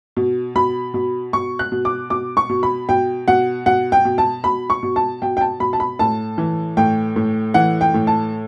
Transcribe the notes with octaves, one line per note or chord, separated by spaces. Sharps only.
B2
B2 B5
B2
B2 C#6
F#6
B2
D6
B2 D6
C#6
B2
B5
B2 G5
B2 F#5
B2 F#5
G5
B2
A5
B2 B5
C#6
B2
A5
B2 G5
G5
A5
B2 B5
A5
B5
A2 A5
E3
A2 G5
A2
E3 F#5
G5
A2
A5